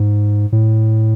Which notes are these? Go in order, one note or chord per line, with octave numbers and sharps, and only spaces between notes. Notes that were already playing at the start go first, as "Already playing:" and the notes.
Already playing: G#2
A2